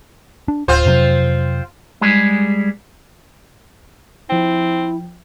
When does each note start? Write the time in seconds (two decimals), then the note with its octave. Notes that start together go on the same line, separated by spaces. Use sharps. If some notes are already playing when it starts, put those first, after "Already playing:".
0.48 D4
0.68 D1 C4 F4 C5
0.86 F2 C3 F#3
2.01 G3 G#3 G#4
4.29 F3 C4 E4 G5